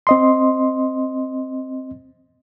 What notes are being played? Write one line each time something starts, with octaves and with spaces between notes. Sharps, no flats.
C4 D#5 C6